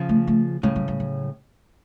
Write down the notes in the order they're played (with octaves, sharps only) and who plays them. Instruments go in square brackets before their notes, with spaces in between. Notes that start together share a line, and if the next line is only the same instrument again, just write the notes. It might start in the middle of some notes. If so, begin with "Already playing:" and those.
Already playing: [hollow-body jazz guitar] C#3 F3
[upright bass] A3
A3
[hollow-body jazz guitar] A2 C#3 [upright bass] G#3
[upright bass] F#3
F#3
F#3